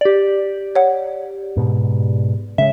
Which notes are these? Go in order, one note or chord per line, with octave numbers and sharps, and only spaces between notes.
G4 D5
C#5 F#5
G#2 B2
C#3 G#3 C#4 E5